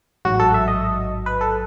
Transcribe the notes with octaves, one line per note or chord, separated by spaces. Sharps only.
A1 G#2 F#3 F#4
A4
E5
D#5
B4
A4